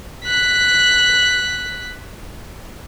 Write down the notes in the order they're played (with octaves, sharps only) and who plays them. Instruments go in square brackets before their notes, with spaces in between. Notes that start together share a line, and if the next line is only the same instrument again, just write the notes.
[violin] F#6 B6